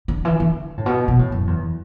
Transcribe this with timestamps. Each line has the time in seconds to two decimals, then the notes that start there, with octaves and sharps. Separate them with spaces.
0.08 D3
0.25 E3
0.40 D3
0.77 A2
0.86 B2
1.08 B2
1.19 A2
1.32 F#2
1.47 E2